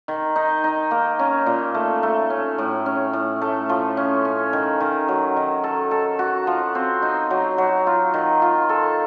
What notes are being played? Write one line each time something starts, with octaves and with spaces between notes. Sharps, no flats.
D#3
D#4
D#4
A#3
C#4
A#2
A3
A3
C#4
A2
C#4
A2
A3
F3
C#4
C#4
D#3
D#3
F#3
D#3
A4
A4
F#4
F3
C4
D#4
F#3
F#3
F4
D#3
F4
A4